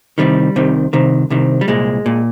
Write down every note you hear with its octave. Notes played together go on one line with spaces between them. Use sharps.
C2 C3 D#3 G3
C2 C3 D#3
C2 C3 D#3
C2 C3 D#3
G3
C2 A#2 G#3
A#2